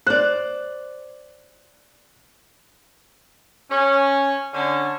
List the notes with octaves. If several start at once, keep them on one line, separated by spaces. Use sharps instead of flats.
C5 D5 F#6
C#4
D3 C#4